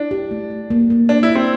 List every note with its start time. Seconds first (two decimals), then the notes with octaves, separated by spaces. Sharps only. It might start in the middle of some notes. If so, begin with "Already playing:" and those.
Already playing: D4 E4
0.11 G4
0.31 A3
0.50 G4
0.70 A#3
0.90 A#3
1.09 D4 C5
1.23 E4
1.29 A#3
1.35 C4